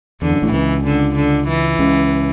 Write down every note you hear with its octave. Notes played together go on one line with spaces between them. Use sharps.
E2 D3
F#2
A1 A2
C#2 C#3 E3
D3
D3
E3
C#2 C#3